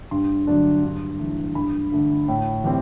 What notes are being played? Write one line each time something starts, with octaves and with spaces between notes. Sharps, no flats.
G2 C6
D3 F#3 A3 D4
G2
E3 A3
G2 B5
D3 A3
A2
E3 G3 C4